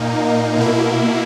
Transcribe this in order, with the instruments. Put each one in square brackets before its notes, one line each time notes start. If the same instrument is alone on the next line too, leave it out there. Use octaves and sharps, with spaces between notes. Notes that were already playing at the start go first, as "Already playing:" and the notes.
Already playing: [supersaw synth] A#2 A#3 D#4
B2 A#3 E4